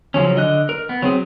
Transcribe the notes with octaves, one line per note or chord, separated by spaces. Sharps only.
C#3 F3 F#3 C#4
D3 D#5 F#6
A#4
B3
F#3 C4 G#4